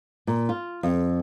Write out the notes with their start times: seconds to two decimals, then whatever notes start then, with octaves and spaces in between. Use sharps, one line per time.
0.27 A#2
0.49 F4
0.83 F2